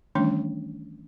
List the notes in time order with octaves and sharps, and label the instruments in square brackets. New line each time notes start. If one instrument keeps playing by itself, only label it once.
[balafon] D#3 E3 G3 A3 C#4 D4